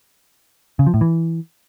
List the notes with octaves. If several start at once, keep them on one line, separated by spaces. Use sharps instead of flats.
C#3
F3
A2
E3